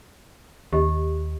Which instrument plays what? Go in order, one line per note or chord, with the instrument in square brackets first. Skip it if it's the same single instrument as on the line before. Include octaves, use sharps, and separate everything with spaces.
[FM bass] D#2 [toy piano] G4 D#5